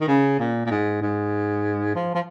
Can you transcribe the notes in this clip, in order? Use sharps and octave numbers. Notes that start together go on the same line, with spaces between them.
D#3
C#3
A#2
A#2
G#2
G#2
F3
F3